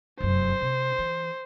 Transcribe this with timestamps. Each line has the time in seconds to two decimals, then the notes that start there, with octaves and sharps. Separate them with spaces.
0.20 F1 F#2 C5
0.61 C3
0.99 E3